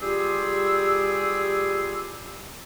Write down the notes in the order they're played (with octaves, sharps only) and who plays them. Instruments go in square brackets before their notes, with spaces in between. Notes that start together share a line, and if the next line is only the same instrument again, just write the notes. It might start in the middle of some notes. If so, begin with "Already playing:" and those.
[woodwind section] G3 F4 G4 G#4 E6